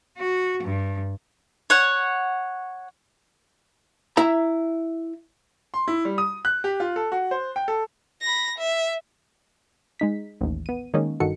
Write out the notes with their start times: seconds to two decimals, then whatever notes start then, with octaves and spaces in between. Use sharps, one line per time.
0.18 F#4
0.62 G2
1.70 C#5 F#5
4.17 E4 E5 A#5
5.74 C6
5.88 E4
6.05 G3
6.18 D#6
6.45 F#6
6.64 G4
6.80 F4
6.96 A4
7.12 F#4
7.31 C5
7.56 G5
7.68 A4
8.22 B5 A#6
8.58 E5
10.00 G#3 D#4 B6
10.41 A1 D#2
10.66 B3 D#7
10.94 D#3 G#3 A#3 C#4 D#4
11.20 G1 D#3 F#4 A4 C#7